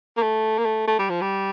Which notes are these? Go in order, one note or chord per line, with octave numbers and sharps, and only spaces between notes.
A#3
A3
A#3
A3
A3
G3
F3
G3